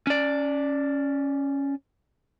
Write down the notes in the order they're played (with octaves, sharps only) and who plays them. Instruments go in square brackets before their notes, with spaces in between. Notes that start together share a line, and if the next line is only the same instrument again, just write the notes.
[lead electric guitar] C#4 D5